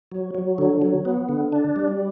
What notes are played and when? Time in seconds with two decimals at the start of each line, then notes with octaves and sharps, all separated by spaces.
0.12 F#3
0.35 F#3
0.58 D3
0.82 F#3
1.05 B3
1.29 D3
1.52 D4
1.76 G3